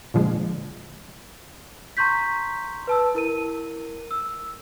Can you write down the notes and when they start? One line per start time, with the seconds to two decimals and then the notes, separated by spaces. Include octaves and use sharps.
0.14 A#2 D3 F3 G#3
1.97 A#5 C6 C#6 G6 B6
2.87 B4 A5 E6
3.14 E4 A#4 D#7
4.11 E6